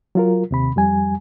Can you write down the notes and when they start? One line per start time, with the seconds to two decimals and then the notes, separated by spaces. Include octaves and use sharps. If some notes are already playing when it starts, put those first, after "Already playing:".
0.15 F#3 F4 A#4
0.51 D#2 C3 B5
0.76 F2 G3 G#5